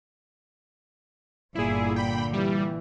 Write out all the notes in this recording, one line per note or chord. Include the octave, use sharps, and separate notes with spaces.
G1 A#2 D3 E4 G#4
G5 B5
E3 G3